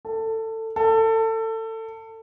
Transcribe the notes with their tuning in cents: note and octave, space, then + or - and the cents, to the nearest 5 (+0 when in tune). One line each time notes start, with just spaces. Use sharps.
A4 +20
A4 +25